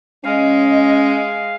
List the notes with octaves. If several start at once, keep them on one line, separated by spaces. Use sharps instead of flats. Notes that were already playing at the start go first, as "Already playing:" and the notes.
G#3 C#4 D#5 F5